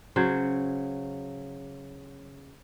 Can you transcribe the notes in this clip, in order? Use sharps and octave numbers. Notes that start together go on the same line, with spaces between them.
C#3 F#3 C5